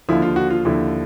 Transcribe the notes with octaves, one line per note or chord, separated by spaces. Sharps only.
D#2 D3 F3 E4
F4
F#4
F4
D#2 D3 F3 E4